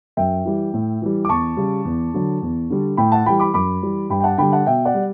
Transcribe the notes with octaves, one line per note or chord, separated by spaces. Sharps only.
F#2 E5 G5
E3 G3
A2
E3 G3
D6
E2 A5 C#6
C#3 G3
E2
D3 F#3
E2
D3 G3
A2 G5 B5
F#5 A5
E3 G3 G5 B5
B5 D6
F#2 B5 D6
E3 G3
G2 G5 B5
G5
F#5 A5
D3 G3 G5 B5
F#5 A5
B2 E5 G5
D5 F#5
G3